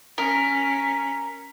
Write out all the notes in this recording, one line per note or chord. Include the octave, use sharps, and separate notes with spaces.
C#4 A#4 B6